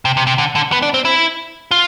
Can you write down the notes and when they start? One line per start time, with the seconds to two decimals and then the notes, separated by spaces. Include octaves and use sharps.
0.05 C3
0.17 C3
0.27 C3
0.38 D3
0.55 D3
0.72 B3
0.82 D4
0.94 C4
1.05 E4
1.71 F4